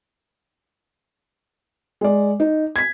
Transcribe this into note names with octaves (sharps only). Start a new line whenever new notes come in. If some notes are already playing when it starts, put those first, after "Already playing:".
G#3 D5
D#4
G#6 B6